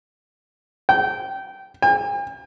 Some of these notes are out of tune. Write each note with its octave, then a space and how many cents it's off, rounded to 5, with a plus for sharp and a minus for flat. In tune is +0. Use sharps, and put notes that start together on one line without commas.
G5 -20
G5 +45